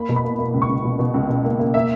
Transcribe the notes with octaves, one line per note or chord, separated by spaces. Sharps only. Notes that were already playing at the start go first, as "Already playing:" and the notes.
Already playing: A#3 B5
B2
B5
A#3
A#3
C#2
C#6
C#2
B2
B2
C#2
B2
A#3
A#3
A#3 E5